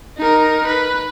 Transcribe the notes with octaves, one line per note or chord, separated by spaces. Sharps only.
D#4 A#4
B4